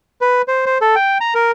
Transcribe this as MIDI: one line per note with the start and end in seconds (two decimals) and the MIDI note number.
0.21 0.42 71
0.48 0.65 72
0.66 0.78 72
0.81 0.95 69
0.95 1.18 79
1.21 1.34 82
1.35 1.51 70